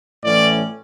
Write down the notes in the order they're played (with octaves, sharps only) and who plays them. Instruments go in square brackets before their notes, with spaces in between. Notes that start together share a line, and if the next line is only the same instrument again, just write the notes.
[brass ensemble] A2 E3 A3 C#4 D5